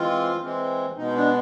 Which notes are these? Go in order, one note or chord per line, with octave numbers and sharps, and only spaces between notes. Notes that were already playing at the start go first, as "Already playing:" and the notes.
Already playing: E3 G#3 C4 F4
E3 G#3 C4
B2 G#3 B3 D#4
D4